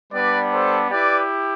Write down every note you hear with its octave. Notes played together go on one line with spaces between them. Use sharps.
G3 B3 D4 B4 D5
A4 C5
E4 G4 B4 D5